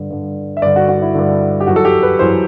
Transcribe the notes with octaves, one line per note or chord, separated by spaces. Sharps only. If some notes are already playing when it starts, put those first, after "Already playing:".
Already playing: G2 D3
G2 D3
E5
G2 D3 D5
F#4
F#4
E4
G2 D3
G4
F#2 E3 F#4
A4
G4
B4
F#2 E3 C5